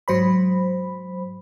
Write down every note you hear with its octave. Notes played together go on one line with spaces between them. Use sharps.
G#2 F#3 C5 B5